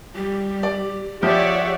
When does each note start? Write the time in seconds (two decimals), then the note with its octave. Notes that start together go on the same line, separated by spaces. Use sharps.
0.16 G3 G4
0.63 D5
1.23 F3 G4 C#5 D5 E5 F#5